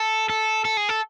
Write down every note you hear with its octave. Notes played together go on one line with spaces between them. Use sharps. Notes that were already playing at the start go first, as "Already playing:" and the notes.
Already playing: A4
A4
A4
G#4
A4